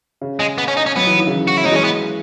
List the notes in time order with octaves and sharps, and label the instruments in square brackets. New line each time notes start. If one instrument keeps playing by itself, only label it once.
[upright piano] C#3
[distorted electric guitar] G#3
B3
C#4
D#4
C#4
[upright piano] F#3 [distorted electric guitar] B3
[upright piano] E3
D#3
C#3 E3
[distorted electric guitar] F#4
E4
[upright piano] F#3 [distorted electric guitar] D#4
[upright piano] E3 G#3 [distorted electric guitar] C#4
[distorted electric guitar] B3